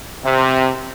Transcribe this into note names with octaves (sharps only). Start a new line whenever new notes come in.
C3